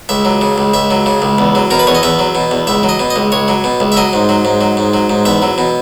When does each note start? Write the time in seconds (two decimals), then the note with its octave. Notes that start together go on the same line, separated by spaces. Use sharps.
0.09 C#2 E5
0.25 F#3
0.41 C#3
0.58 C#2
0.74 C#2 E5
0.91 F#3
1.06 C#3
1.22 C#2
1.38 E2
1.55 F#3
1.70 B2 A#4
1.79 B4
1.87 E2 C#5
1.95 D#5
2.03 E2 E5
2.19 F#3
2.35 B2
2.51 E2
2.67 C#2 E5
2.83 F#3
2.89 D#5
2.99 B2
3.10 D#5
3.16 C#2
3.32 C#2 C#5
3.48 F#3
3.64 B2
3.80 C#2
3.92 E5
3.97 F#3 D#5
4.13 G#2
4.29 F#3
4.45 G#2
4.61 F#3
4.77 G#2
4.94 F#3
5.10 G#2
5.25 E2 E5
5.42 F#3
5.58 B2